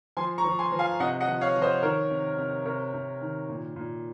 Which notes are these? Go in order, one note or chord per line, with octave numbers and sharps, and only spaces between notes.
F3 G#5 C6
A#5 C#6
F3
G#5 C6
F3
F5 G#5
C3 D#5 F#5
D#5 F#5
F3
C#5 F5
F3
C5 D#5
D#3 A#4 C#5
C3
C3
C3 A#4 C#5
C3
D#3
A#2
A#2